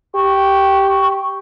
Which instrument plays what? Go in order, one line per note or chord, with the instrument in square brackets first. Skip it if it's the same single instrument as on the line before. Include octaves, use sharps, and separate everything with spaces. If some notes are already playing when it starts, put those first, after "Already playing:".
[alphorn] G4 [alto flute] C#6